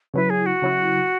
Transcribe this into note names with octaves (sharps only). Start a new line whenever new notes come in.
C#3 F#3 E4 B4
G#4
F#4
C#3 F#3 E4